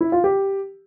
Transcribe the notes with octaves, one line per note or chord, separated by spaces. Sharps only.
E4
F4
G4